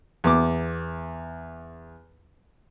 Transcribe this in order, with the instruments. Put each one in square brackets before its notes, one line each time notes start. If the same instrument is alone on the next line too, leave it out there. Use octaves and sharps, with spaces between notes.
[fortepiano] E2 D6